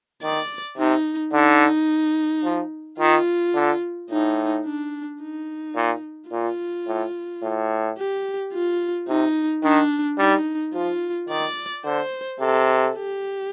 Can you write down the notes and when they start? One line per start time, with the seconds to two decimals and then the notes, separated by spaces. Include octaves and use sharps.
0.22 D#3 D5
0.78 C3 D#4
1.33 D3 D#4
2.44 F3
2.99 D#3 F4
3.55 D3
4.10 A2 D#4
4.65 D4
5.21 D#4
5.76 A#2
6.31 A#2 F4
6.87 A2
7.43 A2
7.98 G4
8.53 F4
9.08 C3 D#4
9.63 D#3 D4
10.18 G3 D#4
10.74 F3 F4
11.29 D#3 D5
11.84 D3 C5
12.40 C3 A4
12.96 G4